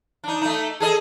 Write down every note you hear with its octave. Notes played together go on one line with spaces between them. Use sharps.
D4 D#4
A3 D#4
G#4 A4 D#5